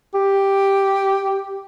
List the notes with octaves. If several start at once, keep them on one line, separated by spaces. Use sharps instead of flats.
G4